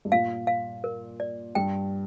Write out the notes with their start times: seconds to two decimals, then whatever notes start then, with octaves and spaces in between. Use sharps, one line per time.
0.05 G2
0.12 A#2 F5
0.47 F5
0.84 A#4
1.20 D5
1.55 G2 G5